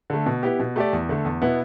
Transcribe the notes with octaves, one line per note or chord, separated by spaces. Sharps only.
D3 A3
B2
B3 E4 G4
B2
A3 G4 D5
E2
D3 A3
E2
B2 B3 E4